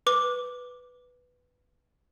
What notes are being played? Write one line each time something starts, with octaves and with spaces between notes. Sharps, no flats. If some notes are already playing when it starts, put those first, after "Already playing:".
B4 D6